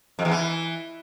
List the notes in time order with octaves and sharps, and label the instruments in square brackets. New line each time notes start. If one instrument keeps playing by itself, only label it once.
[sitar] F2
E2
E3